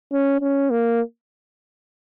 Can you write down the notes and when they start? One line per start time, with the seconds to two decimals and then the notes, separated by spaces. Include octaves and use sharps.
0.12 C#4
0.41 C#4
0.70 A#3